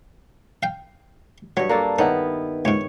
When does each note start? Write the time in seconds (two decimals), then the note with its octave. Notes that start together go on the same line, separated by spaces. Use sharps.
0.63 F5 G5
1.57 G2 F#3 C#5
1.69 A#3 D4 A4
1.99 D#3 B3 C#4 E4
2.65 C#2 G#2 C#5